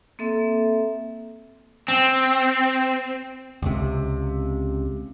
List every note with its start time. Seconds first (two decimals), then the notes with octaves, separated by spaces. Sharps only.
0.19 A#3 C4 A4 E5
1.88 C4
3.62 C#2 C3